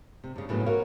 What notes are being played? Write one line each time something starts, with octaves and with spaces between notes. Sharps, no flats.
C3
G2 C#3
A2 C#3 E3 F#3 A3 B3
F#4 A#4 C#5 F5